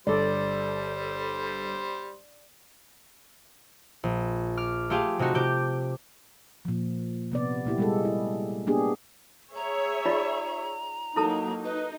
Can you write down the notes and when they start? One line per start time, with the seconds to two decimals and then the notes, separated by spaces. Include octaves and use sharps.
0.07 G1 G3 A4 C5 D5
4.04 A#1
4.57 D6 F6
4.90 A3 F4 G4 G#4 F5
5.19 C3 A3 D#4 F#4
5.35 C3 G4 D6 G6
6.65 A#2 F3
7.32 C3 B3 D5
7.65 A#2 A#3 E4 G4
7.78 G3 G#3 A4
8.05 E4
8.67 A#3 B3 D4 G4 G#4
9.55 G#4 C#5 E5 A#5
10.06 D#4 F4 D5
11.16 F#3 A#3 D#4 E4 A4 A5
11.64 D#4 B4